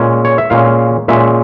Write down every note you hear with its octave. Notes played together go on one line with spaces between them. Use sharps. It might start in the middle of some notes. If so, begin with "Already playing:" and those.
Already playing: A#2 G#3 C#4
C#5
E5
A#2 G#3 C#4 F5
A#2 G#3 C#4 E5